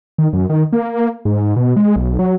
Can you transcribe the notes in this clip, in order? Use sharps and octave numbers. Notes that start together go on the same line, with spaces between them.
D#3
F#2
D#3
A#3
G#2
B2
G#3
B1
F#3